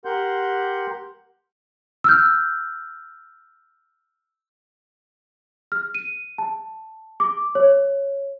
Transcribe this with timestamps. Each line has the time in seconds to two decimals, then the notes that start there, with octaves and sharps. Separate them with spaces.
0.05 G4 A#4 F#5 C6 G6
2.04 E6 F6 G6
5.72 F6
5.95 D#7
6.38 A5
7.20 D6
7.55 C#5